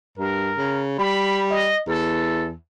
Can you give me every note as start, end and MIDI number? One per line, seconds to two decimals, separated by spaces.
0.17 0.52 43
0.17 0.84 70
0.57 0.97 49
0.99 1.72 55
0.99 1.47 83
1.51 1.82 75
1.87 2.53 40
1.87 2.49 69